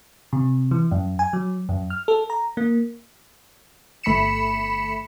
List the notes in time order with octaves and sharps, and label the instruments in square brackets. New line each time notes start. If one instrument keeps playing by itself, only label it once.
[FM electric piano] C3
E3
F#2
G#5
F#3
F#2
F6
A4
A#5
A#3
[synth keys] G1 A3 B5 B6 C#7 E7